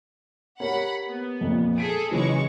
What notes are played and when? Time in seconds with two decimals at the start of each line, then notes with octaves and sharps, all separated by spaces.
0.60 G4 A#4 C#5 F#5 B5
1.07 B3
1.41 F2 A#2
1.78 G#4 A4 B6 D7
2.11 C#3 E3 F#3 G#3 C#6